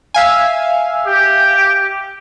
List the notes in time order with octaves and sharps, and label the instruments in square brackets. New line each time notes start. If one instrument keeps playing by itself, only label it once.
[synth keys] E5 F5 G#5
[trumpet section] G4